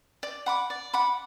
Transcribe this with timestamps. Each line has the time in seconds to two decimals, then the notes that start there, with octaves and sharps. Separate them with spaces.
0.23 D5
0.46 F#5 B5 D6
0.70 D5
0.93 F#5 B5 D6